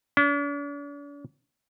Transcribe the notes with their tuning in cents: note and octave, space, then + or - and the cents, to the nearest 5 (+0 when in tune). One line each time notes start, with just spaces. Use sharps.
D4 -45